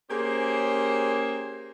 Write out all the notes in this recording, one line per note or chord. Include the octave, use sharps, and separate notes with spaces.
A#3 C#4 G4 G#4 C5